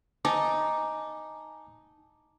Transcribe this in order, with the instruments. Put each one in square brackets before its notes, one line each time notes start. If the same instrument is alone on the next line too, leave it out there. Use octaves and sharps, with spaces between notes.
[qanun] D#4 [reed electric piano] G#5 A5 D6